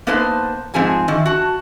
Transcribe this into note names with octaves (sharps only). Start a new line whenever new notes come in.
A#3 B3 D#4 B4 C5 A5
G#2 F3 C4 G#4 G#5 A5
D#3 E3
F#4 A5